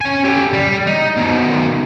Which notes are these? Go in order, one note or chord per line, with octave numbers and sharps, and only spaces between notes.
C#4 G#5
G4 A4
G3
D#4
B2 D#3